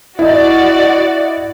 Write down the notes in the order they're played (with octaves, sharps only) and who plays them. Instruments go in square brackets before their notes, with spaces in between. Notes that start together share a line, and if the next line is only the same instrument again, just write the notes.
[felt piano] E4 D#5 [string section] F#4 D5